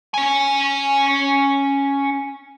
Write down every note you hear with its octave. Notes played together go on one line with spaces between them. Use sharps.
C#4 G#5